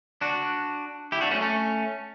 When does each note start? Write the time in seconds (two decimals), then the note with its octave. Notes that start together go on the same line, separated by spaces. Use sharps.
0.21 D4 F#4
1.12 E4 G4
1.21 D4 F#4
1.31 A3 C#4
1.41 A3 C#4